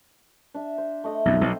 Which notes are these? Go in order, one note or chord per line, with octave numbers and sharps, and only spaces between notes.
D4 E5
C5
A3 D#5 E5
B1 F2
B1 B2 C4